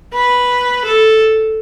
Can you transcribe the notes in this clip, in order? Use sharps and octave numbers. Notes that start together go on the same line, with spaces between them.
B4
A4